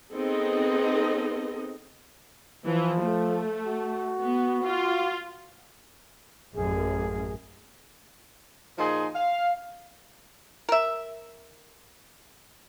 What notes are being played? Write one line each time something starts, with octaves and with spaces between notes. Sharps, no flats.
B3 C4 D#4 G#4 A4 D#5
E3 F3
A3
F#4
B3
F4
A1 F#2 A#3 G#4
A#2 F3 D#4 G#4 G#5 C6
F5
A#4 E5